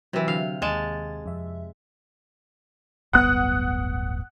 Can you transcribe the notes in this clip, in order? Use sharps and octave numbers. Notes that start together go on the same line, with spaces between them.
C3 E3 F#3
D3 F#3 F5
D#2 G#3 A5 A6
F2 E5
D1 G1 B3 F#5 D#6 F#6